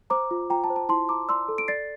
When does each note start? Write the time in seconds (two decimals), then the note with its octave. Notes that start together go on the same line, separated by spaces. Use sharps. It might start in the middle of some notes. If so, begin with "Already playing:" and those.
0.10 C5 A#5 D6
0.31 F4
0.50 F4 G5 A#5
0.64 A5
0.70 C5
0.76 A5
0.89 E4 A5 C6
1.09 E4 A#5 D6
1.29 D5 C6 E6
1.49 A4
1.58 D7
1.68 D5 A6 C7